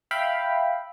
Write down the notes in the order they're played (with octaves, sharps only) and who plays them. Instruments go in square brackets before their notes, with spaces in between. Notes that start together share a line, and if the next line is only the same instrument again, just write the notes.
[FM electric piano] E5 F5 G5 B5